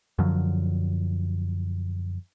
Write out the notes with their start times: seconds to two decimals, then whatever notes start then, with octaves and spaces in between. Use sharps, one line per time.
0.19 F#2 D3 F3 F#3